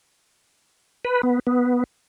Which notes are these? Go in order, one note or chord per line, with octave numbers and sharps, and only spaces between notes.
B4
B3
B3